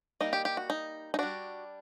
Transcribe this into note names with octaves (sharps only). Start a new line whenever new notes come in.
G3 A#3 D#4 D#5
G4
G4
F#4
D#4
D#4
G3 D4 F#4